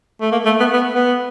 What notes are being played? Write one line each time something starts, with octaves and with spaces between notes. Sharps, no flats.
A3
A#3
A3
B3
B3
B3